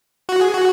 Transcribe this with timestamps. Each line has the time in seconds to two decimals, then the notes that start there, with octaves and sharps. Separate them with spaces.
0.29 F#4
0.41 G#4
0.54 F#4